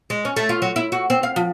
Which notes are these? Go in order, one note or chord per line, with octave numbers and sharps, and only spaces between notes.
G#3
C#4
A3
F4
F#3
E4
F#4
C4
F5
F3